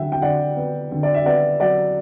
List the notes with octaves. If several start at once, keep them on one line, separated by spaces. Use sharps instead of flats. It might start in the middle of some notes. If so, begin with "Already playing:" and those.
Already playing: D3 F#3 E5 F#5 G5
G5
D3 D5 F#5
B3
D3
D5
E5
B3 D5 F#5
F#3 D5 F#5